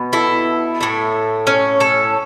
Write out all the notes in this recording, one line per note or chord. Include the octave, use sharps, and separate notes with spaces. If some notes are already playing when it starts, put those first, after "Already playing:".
Already playing: B2 B3
E4 A4
A2 A3
C#4
A4 C#5